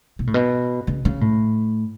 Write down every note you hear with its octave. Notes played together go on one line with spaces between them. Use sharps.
B2
A2
B2
C#3
C#3
A2